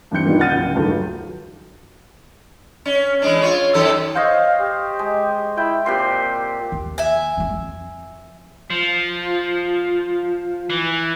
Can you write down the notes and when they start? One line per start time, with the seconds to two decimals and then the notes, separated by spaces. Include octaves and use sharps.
0.11 G2 E3 G3 C4 G6 C#7
0.25 A#2 D#3 G3 B3 D4 D#4
0.38 C#2 C#3 F#5 F6 A6 D#7
0.50 D1 C#3 F#5 G6
0.75 C#2 G2 D#3 F#3 G#3 A3
0.92 F#3
2.86 C#4
3.22 E3 G#3 D4
3.42 F4 C#5
3.74 F#2 D#3 A4
4.15 C5 C#5 D#5 F5
4.60 G4
4.99 G#3
5.57 E4 G5
5.86 A#2 C4 G4 C6
6.72 D#2
6.98 E5 G#5
7.37 E2 C3
7.52 F2
8.70 F3
10.70 E3